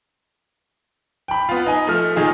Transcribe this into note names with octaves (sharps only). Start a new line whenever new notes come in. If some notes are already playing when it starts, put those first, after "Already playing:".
G5 B5
B3 F4
D#4 G#5
F3 A3 F6
A#2 D#3 D#4 F4 G#4